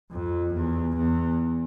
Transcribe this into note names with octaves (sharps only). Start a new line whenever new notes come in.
F2
E2
E2